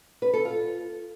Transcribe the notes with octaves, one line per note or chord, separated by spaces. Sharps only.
B4
A4
F4